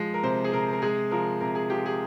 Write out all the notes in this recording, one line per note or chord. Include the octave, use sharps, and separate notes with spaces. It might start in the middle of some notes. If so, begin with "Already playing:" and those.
Already playing: F3 G#3
A#4
C3 C5
G#4
C3 A#4
A#4
G#3 G#4
F3 A#4
C3 A#4
G#4
F3 G4
G#4